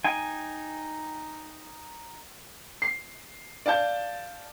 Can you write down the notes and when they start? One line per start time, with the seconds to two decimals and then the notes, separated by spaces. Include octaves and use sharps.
0.04 D#4 G5 G#5
2.82 C7
3.66 D5 F5 A5 G6